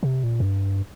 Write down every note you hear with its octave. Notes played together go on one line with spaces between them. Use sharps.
C3
A#2
F2
G2